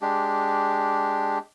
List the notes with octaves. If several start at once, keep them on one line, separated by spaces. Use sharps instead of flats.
G#3 D4 G4